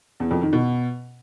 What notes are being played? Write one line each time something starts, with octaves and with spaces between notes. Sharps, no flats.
E2
F2
D#3
B2